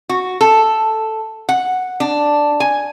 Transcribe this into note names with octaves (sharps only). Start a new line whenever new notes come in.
F#4
A4
F#5
D4
G#5